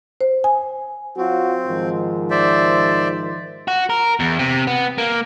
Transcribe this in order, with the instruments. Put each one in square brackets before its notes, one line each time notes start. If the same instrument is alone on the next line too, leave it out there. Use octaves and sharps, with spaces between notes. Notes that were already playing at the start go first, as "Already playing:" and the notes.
[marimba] C5
G#5
[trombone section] F#3 F4 F#4 [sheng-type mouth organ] C4
[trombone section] G#2 D#3 F3
[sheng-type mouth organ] C5 D5 E5
[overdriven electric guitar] F#4
A#4
E2
C3
B3
A#3